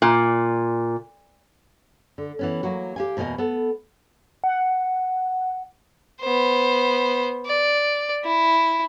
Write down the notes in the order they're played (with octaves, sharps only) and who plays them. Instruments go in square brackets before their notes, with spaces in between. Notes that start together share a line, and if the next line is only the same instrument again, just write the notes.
[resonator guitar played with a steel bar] A#2
[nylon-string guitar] D3
E3 B3 C#4
F#3 A#3 F#4
G4 F5 G#5
E2 B2 A#3 D#5 G#5
B3 A4
[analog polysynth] F#5
[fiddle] B3 C5
D5
E4